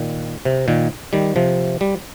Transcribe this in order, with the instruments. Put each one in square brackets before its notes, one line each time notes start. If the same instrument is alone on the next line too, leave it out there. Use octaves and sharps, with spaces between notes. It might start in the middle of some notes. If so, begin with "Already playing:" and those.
Already playing: [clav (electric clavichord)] A#2 D#3
C3
A#2 D#3
D#3 G3
C3 F3
G3